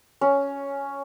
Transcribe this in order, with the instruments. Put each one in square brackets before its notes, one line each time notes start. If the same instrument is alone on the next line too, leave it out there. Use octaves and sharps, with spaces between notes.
[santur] C#4